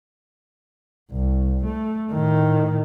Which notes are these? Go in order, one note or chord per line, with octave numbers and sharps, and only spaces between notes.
C2
A3
A2 D#3